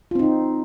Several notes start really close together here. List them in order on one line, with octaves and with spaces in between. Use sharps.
F4 C4 D#4